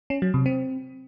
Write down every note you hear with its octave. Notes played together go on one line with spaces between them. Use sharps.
C#4
F#3
C3
C4